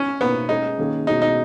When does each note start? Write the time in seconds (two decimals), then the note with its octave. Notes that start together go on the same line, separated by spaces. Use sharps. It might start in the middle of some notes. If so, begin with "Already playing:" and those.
Already playing: C#4
0.21 B2 A#3 B3 D#4 F#4
0.49 G#3 C#4 D#4 G#4
0.78 D#3 A#3 C#4 G#4
1.07 B2 G#3 C#4 D#4 F#4
1.22 D#4